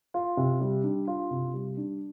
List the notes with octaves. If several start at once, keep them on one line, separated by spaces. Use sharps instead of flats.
F4
C3
G3
D4
F4
C3
G3
D4